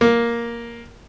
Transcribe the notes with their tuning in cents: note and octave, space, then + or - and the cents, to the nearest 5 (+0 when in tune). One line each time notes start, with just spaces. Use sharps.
A#3 +5